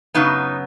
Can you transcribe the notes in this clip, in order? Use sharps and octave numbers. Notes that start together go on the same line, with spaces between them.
F#2 C#3 F#3 B3 D#4